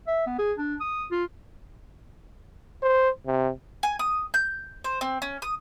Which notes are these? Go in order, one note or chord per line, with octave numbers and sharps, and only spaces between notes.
E5
B3
G#4
D4
D#6
F4
C5
C3
G#5
D#6
G6
C5
C4
C#4
D#6